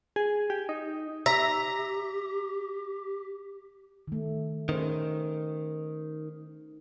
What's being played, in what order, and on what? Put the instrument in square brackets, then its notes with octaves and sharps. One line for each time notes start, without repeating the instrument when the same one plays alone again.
[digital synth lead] G#4
G4
D#4
[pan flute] G4 [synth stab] E5 [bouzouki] A#5
[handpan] D#3 A3
[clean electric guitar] D#3 [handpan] C#4 G#4 C5